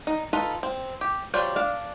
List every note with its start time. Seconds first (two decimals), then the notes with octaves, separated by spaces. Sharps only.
0.07 D#4
0.33 D#4 F4 A4 B4
0.63 C4
1.01 G4
1.34 F#3 G3 F4 C5 D5
1.56 D4 F5